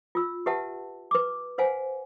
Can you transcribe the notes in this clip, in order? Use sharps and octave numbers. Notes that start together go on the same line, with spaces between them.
F4 E6
G4 B4 E5 F#5 A5
B4 D6
B4 C5 F5 F#5 G#5